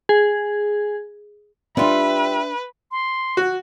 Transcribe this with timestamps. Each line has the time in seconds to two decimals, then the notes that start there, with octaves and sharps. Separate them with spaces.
0.09 G#4
1.77 G3 C4 D4 F4 B4 E5
2.91 C6
3.37 F#4